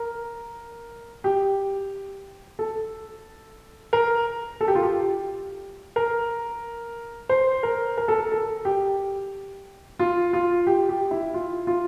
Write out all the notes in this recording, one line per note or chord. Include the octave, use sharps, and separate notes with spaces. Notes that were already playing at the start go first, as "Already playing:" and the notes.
Already playing: A#4
G4
A4
A#4
A4
G4
F4
G4
A#4
C5
A#4
A#4
A4
A#4
A4
G4
F4
F4
G4
G4
E4
F4
F4